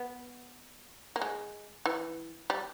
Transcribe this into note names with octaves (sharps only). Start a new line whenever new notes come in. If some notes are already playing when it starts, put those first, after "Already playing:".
Already playing: B3
A#3
G#3
E3
G3